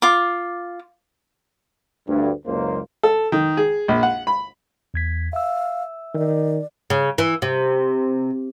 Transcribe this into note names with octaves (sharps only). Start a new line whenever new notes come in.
F4 D6
D2 G2
F#1 C#2 A#3 C5
A4
D#3
G#4
A#1
F#5
B5
E2 G#6 B6
E5 F5 E6
D#3 D5
C#3
E3
C3